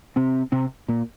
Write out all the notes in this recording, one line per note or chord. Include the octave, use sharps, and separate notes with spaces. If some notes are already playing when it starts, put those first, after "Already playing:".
C3 C4
C3 C4
A#2 A#3